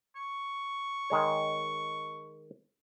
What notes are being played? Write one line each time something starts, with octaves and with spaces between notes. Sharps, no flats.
C#6
D#3 G#3 C#5